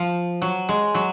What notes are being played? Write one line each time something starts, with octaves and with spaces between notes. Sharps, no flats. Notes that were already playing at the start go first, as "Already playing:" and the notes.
Already playing: F3
F#3
G#3
F#3